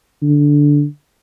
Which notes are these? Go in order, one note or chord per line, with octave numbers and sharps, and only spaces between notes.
D3